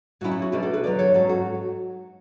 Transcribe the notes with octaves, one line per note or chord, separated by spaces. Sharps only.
A2 F#3 C#4 E4 F#4
E4
F#4
B2 A3 D4 E4 G#4
F#4 A4
G#4 B4
E2 D3 F#3 B4 D5
A4 C#5
G#2 F#3 C#4 F#4 A4
F#4